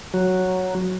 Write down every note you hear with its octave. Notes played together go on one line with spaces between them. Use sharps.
F#3